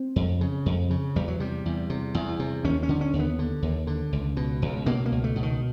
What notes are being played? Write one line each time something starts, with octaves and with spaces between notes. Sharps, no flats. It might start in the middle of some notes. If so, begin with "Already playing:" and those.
Already playing: C4
F2
C#3
F2
C#3
E2 G3
F#3
C3 G3
E2
C3
E2
C3
D#2 C#4
C#4
D3
C#4
D#2
B3
D3
D#2
D3
C#2
B2
C#2
B2 A#3
A#3
C#2
A3
B2
D#3